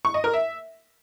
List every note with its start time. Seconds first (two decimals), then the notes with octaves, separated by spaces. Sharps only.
0.05 C#6
0.14 D#5
0.24 A#4
0.34 E5